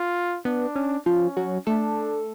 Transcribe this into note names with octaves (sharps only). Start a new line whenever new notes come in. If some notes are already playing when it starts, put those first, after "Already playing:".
Already playing: F4
B3 D4
C#4
F3 C#4 F4
F#3 F#4
A3 D4 A4